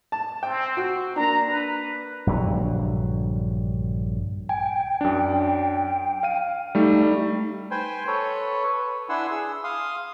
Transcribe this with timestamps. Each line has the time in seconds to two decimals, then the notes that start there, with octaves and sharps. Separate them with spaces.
0.12 A5
0.43 C4 G5
0.77 F#4
1.16 A#3 D4 A#5
1.48 B4
2.27 A#1 G2 D3 F#3
4.49 G5 G#5
5.01 F#2 D4
6.23 F5 D#7
6.75 G3 A3 D#4
7.71 B4 C5 G5 G#5 C6
8.07 A4 B4 C#5
8.79 B4
9.09 D4 E4 F#5 G#5 C6 E6
9.31 G#4 E6
9.64 F5 C6 D#6